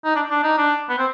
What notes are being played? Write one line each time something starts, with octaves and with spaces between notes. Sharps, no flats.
D#4
D4
D4
D#4
D4
B3
C4